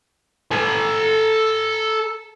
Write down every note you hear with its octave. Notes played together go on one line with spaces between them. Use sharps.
A4 G#5